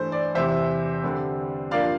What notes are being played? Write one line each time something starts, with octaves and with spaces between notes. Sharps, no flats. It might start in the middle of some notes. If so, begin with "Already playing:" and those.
Already playing: G2 E3 A3 C5
D5
E2 C3 E3 C5 E5
D3 G3 C4
G2 F3 A#3 D4 D5 F5